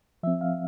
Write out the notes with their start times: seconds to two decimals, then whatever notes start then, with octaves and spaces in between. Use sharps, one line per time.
0.23 F3 C4 E5
0.41 F5